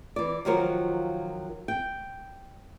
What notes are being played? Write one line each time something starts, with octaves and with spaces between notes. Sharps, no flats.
E3 D5
D#3 F3 F#3 F4 F#4 A#4
G5